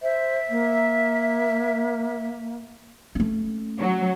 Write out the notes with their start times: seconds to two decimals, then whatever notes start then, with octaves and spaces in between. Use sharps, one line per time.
0.02 C5 E5
0.50 A#3
3.15 A3 C#4
3.79 F#3